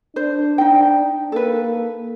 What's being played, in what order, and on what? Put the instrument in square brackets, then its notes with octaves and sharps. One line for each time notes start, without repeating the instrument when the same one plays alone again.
[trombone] D4 [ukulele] C5
[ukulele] D#4 G5
[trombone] A#3 [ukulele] A4 B4